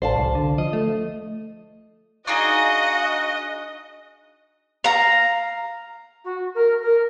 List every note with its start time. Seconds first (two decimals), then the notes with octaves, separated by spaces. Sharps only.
0.02 A1 C5 D5 F5 A5
0.16 C2
0.35 D3
0.58 F3 D#5
0.73 A3
2.27 D4 D#4 F#4 G#4 D#5 F5
4.84 F5 A#5
6.25 F#4
6.55 A#4
6.83 A#4